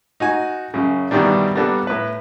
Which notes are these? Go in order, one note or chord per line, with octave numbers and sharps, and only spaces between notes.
D#4 F#4 G#5
F#2 C#3
G2 B2 D#3 E3 G3 D4
G3 A#3 B3 D4 A4
A2 B4